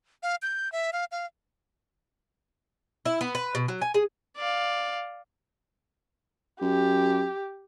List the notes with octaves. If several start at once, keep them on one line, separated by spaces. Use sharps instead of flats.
F5
G6
E5
F5
F5
E4
B3
B4
B2
F#3
G#5
G#4
D5 F5
F#2 G4